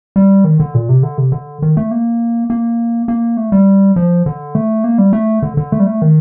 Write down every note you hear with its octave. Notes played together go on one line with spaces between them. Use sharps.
G3
D#3
D3
A#2
C3
D3
C3
D3
D#3
A3
A#3
A#3
A#3
A3
G3
F3
D3
A3
A#3
G3
A3
D3
D3
A3
G3
A3
D#3